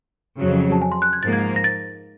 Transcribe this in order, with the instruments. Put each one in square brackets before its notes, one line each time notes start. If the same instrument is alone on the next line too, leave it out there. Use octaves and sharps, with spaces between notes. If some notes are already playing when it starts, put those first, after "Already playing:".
[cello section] F2 C#3 F#3
[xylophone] A5
G#5
C6
F#6
G#6
[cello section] G#2 F3 A#3 [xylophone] A6
[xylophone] G#6
A#6
A6